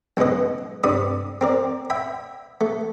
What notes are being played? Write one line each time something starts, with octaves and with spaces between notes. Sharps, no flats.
B1 C#3 G#3 B4 D#5
G2 C3 D5 B5 D#6
C4 A#4 D5
E5 G5 B5
A3